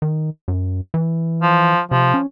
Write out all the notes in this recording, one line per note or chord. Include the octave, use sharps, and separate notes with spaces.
D#3
F#2
E3
F3
C3 F3
C#4